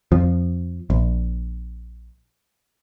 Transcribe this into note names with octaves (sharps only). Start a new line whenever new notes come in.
F2 F3
A#1